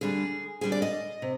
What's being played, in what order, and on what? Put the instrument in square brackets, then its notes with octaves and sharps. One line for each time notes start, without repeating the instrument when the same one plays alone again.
[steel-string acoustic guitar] D3 G3 D4 G#4
D3 G3 D4 G#4
D5
D#5
C3